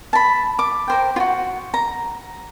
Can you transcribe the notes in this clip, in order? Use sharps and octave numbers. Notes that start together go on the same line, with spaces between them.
A5 B5
D6
A#4 C5 G5
F4 F#4
A#5